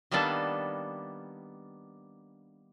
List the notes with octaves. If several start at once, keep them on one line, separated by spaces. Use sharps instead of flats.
D#3 G3 A#3 B3 D4 A4